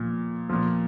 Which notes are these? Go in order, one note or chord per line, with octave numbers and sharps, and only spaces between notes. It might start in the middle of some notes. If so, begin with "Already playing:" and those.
Already playing: A#2 F3
A#2 F3